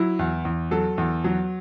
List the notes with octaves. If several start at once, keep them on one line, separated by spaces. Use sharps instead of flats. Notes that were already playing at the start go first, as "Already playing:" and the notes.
Already playing: F#3 E4
E2
E2
F#3 A4
E2
F#3